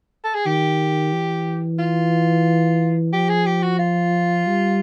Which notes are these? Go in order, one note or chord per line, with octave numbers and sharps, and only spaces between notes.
A4
G#4
D#3 G4
E3
F4
F3 G4
G#4
G4
F#4
F4
G3